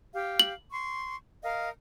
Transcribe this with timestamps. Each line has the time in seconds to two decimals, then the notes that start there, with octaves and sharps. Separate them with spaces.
0.14 G4 F5
0.40 F#7
0.71 C6 C#6
1.43 A#4 D#5 F5